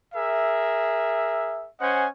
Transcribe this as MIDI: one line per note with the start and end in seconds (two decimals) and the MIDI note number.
0.14 1.68 68
0.14 1.68 70
0.14 1.68 76
1.81 2.07 61
1.81 2.07 72
1.81 2.07 75
1.81 2.07 78
1.81 2.07 80